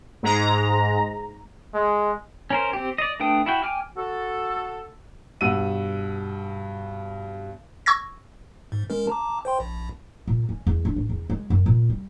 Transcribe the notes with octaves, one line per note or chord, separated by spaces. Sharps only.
G#2 G#3 A#5
G#3
C#4 A#4 C5
C4 G4
D5 D#5
A3 D4 B4 G5 D#6
E4 F#4 G5
G5 G#5 D6 F6
F#4 A4
G2 B2 F#5 E6 D#7
C#6 E6 G#6 A#6
G#2
G#3 C#4 A#4
A5 A#5 D6
C5 G5 C6
A#1
A#2
C#4
E2
D4
A1
E2
G#3
F#2
A#2
G3